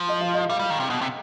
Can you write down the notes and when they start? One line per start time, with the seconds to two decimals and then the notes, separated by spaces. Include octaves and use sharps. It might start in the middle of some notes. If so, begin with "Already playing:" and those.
Already playing: F3
0.09 D#5
0.21 F5
0.34 D#5
0.49 G3 F5
0.59 G3
0.70 D#3
0.80 C3
0.90 B2
1.01 C3